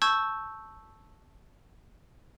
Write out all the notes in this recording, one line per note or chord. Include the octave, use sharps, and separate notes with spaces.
A5 C#6 E6 G6 G#6